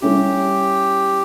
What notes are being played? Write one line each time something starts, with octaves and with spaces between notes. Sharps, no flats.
G3 C#4 E4 G4